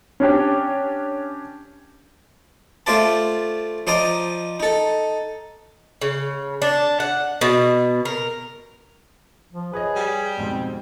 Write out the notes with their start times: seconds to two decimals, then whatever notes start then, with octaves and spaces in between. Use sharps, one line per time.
0.20 C#4 D4 G4
2.86 A3 F4 C5 D5 E5 A5
3.87 F3 C5 D5 D#5 G5 A#5
4.60 D#4 A4
6.01 C#3
6.62 D4
7.00 F#5
7.41 B2
8.05 A#4
9.53 F3
9.73 G#4 B4 C#5 D#5
9.96 G3
10.37 F2 G#2 B2 C4